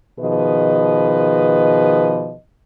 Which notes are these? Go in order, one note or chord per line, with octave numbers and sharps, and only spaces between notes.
B2 D#3 F3 G#4 B4 D#5